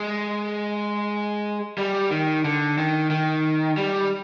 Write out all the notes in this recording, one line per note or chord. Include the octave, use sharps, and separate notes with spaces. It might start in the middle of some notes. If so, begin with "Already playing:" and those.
Already playing: G#3
G3
D#3
D3
D#3
D#3
G3